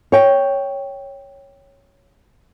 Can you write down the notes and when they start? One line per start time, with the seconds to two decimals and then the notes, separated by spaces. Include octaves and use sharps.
0.12 C#5 G5